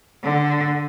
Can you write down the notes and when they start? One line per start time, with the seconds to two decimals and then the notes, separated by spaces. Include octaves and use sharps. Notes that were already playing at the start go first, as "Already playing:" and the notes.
0.23 D3